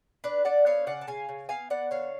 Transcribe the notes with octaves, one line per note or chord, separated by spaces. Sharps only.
D4 B4 D5
D4 D5 F#5
B3 C#5 F5
C#3 D5 F#5
A5
C#3 F5 G#5
C#3
B3 F5 G#5
B3 D5 F#5
D3 C#5 F5